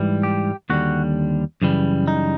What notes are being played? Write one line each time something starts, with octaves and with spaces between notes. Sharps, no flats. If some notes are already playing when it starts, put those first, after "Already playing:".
Already playing: G#2 E3 G3
G4
D#2 D3 G3 F#4
F#2 C#3 E3 G3
D#4